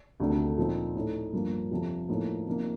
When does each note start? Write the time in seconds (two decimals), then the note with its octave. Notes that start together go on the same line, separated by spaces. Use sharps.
0.20 D2 C3 D#3 A3 D4
0.57 A#2 F3 C4 D#4
0.95 A2 A3 D#4
1.33 G2 F3 A#3
1.71 F2 C3 F3
2.09 A2 F3 A#3 D#4
2.47 C3 F3 A#3 D#4